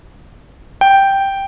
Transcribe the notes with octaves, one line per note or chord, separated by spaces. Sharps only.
G5